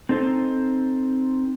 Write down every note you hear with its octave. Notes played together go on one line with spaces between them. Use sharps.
C4 D#4 A4 C5